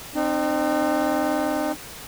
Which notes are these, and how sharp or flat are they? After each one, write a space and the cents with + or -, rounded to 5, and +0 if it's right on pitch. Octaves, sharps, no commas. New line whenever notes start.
C4 +10 D#4 -40